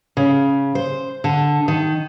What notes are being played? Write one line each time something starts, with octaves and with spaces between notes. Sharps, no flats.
C#3
C5
D3
D#3